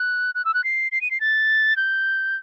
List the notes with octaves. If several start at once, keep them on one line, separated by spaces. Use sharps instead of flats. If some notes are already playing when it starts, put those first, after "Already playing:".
Already playing: F#6
F#6
E6
F#6
C7
C7
D#7
C7
A6
G6